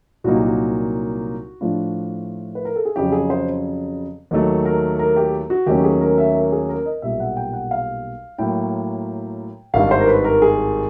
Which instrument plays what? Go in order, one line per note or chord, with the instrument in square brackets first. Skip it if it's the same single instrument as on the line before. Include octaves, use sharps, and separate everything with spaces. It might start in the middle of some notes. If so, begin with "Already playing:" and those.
[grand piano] C2 A#2 F#3 A#3 D#4 F#4
G4
F#4
A2 F3 A3 D4 F4
B4
A#4
A4
G#4
F2 C#3 F#3 G4
G#4
C5
D#2 D#3 F#3 A3
A#4
A#4
G4
F#4
D#2 D#3 F#3 A3 C#4 G4
G#4
A#4
E5
A#4
G#4
A#4
D#5
B1 A#2 G3 E5
F#5
G5
F#5
F5
A2 F#3 A#3 G5
G#1 G2 D#3 G3 F5
C5
A#4
B4
A#4
G#4